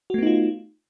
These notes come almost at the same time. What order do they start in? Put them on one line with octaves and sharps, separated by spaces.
F#4 A3 B3 D#4 F4